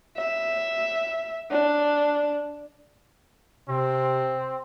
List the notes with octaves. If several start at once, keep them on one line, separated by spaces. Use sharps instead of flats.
E5
D4
C3 C4